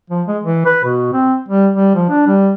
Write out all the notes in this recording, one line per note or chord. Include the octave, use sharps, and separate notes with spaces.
F3
G#3
E3
B4
B2
C4
G3
G3
F3
D4
G3